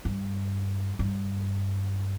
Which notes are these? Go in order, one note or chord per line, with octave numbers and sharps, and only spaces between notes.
G2
G2